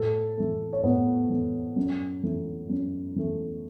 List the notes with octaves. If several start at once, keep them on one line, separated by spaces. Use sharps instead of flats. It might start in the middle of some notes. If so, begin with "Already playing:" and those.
Already playing: A2 A4
E3 A3
C#5
A2 B3 B4
E3 A3
F#2
E3 A3
F#2
E3 A3